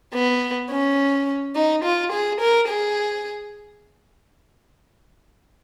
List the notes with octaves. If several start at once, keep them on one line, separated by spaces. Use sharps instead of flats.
B3
C#4
D#4
F4
G#4
A#4
G#4